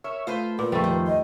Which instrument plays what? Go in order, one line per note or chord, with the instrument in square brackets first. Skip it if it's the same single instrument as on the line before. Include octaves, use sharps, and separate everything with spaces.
[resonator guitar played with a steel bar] A#4 [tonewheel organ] C#5 E5
[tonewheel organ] A3 [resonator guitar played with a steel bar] F4 B4 C5
[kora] A#2 [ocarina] B4
[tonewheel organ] F2 F3 C5 [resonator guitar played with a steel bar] C#3 [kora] G3 A3
[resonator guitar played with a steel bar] D#3
[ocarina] D#5